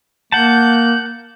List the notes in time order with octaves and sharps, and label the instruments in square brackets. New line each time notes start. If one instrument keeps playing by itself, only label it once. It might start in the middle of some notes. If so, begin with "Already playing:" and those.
[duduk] A#3 [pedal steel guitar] F#5 A5 [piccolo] G6